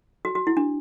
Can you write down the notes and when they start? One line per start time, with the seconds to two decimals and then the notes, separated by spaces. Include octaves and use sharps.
0.25 F#4
0.35 F#4
0.47 E4
0.57 D4